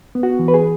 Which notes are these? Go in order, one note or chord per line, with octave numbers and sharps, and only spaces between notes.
B3
F#4
E3
B4
G#4